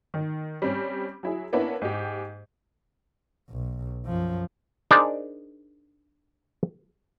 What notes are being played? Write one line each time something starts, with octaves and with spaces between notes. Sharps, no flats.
D#3
G3 C4 C#4
F#3 E4 G#4
A#3 B3 C#4 D4 E4
G#2 G4
B1
F#2 F3
D4 D#4 G#4 A#4 C5 D5